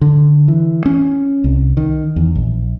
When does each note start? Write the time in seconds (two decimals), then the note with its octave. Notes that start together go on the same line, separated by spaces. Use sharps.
0.01 D3
0.48 E3
0.86 C#4
1.44 C2
1.77 D#3
2.16 E2
2.36 A#1